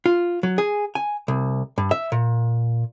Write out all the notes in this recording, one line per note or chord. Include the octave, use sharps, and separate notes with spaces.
F4
F#3
G#4
G#5
C2
G2
E5
A#2